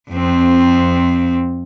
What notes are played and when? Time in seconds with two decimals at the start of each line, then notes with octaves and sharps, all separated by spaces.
0.11 F2 C4